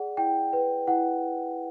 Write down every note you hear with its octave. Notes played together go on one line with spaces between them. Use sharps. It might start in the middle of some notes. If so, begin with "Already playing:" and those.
Already playing: G#4 D5 F#5
E4 G5
B4
E4 F#5